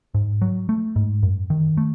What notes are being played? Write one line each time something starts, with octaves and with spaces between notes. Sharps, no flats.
G#2
F#3
A3
G#2
F#2
D#3
A3